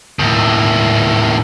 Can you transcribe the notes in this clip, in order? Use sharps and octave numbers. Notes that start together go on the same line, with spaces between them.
D#2 A2